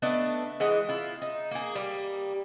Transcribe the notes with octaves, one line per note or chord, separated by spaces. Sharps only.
A3 B3 D4 D#5
E3 G#3 D#5 F#5
E4 F4
D#4
A#3 G#4
G3 A#3